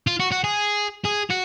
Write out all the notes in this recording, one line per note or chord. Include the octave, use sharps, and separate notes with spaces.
F4
F#4
F#4
G#4
G#4
F#4